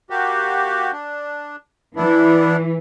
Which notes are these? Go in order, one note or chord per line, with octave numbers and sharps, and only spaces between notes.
A#3 F#4 G4
D4
E3 B3 D4 E4